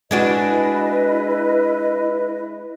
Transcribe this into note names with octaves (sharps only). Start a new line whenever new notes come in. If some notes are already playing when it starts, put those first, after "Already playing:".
G#3 D4 E4 F#4 B4 D#5